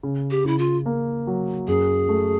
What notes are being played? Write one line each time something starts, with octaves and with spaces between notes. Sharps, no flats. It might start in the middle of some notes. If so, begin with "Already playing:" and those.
C#3
G4
C#3 E4
F4
A#3
F#3
F#2 G#4
A3